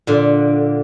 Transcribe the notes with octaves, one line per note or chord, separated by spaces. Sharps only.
A#2 D3